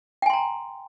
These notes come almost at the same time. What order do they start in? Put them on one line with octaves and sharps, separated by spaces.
G5 G#5 C6 A#5